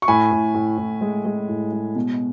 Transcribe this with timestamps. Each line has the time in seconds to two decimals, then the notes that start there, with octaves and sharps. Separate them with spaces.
0.02 C#6
0.08 A2 G#5 B5
0.31 A2
0.55 A2
0.78 A2
1.01 G#3
1.25 G#3
1.49 A2
1.72 G#3
1.95 B2